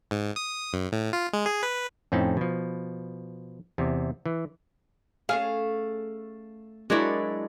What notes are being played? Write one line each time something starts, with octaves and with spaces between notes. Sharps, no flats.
G#2
D#6
F#2
A2
F4
G#3
G#4
B4
F2 A2 C4 C#4 D#4 A5
B2 F3
E2 C3
E3
A3 C#4 G#4 F5
F#3 G#3 D4 E4 F#4 A#4 C#5 D5